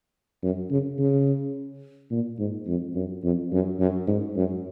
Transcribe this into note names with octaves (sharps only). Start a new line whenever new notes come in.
F#2
C#3
C#3
A#2
G#2
F2
F#2
F2
F#2
F#2
G#2
F#2